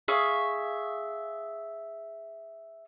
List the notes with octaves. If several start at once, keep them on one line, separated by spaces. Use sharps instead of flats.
G#4 E5 F5 C#6